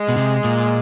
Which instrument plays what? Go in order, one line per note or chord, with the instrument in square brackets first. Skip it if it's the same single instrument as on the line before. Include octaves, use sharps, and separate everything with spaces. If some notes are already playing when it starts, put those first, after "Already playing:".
Already playing: [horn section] G#3
[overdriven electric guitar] B2
C3
A#2